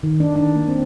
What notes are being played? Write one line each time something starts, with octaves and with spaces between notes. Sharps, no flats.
D#3
D4
D4
A#3
C4